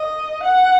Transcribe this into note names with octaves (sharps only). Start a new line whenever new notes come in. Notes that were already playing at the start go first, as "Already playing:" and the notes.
Already playing: D#5
F#5